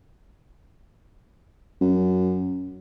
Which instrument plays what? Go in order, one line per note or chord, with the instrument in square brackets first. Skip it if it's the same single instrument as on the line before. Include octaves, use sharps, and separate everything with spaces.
[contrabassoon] F#2